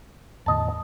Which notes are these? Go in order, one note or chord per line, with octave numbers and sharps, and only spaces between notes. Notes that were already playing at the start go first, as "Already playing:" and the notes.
E2 A2 D3 D#5 A5